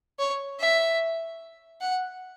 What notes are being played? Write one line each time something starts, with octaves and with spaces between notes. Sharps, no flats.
C#5
E5
F#5